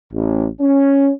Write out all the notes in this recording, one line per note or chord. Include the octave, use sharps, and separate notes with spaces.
A1
C#4